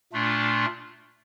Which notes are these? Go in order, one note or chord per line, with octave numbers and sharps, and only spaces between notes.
A#2 A3 D4 F4